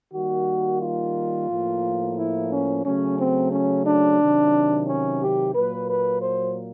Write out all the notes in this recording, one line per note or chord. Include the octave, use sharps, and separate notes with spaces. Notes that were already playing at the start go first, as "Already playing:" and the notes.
D#3 G3 A#3 F#4
F4
A2 F3 A#3
E4
C#4
C#3 F#3 A3 C#4
C4
C#4
D4
C3 D#3 F#3
C#4
G4
A#2 F#3 A#3 B4
B4
C5